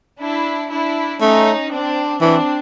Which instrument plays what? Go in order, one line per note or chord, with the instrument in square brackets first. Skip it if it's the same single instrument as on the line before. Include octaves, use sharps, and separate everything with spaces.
[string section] D4 E4
D4 E4
[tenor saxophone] A3 [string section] C#4 D#4
[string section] C4 D4
[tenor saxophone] E3 [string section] C4 D4